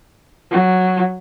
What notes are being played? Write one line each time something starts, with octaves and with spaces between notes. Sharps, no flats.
F#3